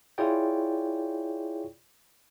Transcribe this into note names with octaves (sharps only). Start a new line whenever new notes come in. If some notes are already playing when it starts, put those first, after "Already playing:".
E4 F4 G#4 C#5 D5 G5